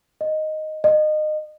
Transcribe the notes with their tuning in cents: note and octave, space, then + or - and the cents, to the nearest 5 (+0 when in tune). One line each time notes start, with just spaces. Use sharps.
D#5 +0
D#5 -25